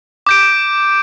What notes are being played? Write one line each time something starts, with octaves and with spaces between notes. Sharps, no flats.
D6 G6 D7